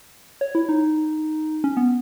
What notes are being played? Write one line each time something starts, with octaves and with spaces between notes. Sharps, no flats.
C#5
E4
D#4
C#4
B3